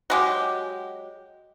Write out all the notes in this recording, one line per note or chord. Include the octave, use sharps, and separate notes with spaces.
F#3 G#3 G4